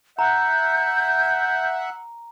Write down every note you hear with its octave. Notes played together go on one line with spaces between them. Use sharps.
E5 F#5 A#5 G6